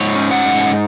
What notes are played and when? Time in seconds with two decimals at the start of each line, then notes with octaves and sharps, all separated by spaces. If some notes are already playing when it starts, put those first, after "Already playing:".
Already playing: G#2 C#5
0.15 C#4
0.31 F#5
0.46 G#2